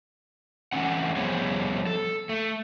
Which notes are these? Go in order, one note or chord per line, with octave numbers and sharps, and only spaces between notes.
E3 A3 C4 C#4 F#5
F3 G3 B3 G#4 C5 C#5
A4
A3